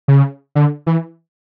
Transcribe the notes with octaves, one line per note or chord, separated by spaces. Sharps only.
C#3
D3
E3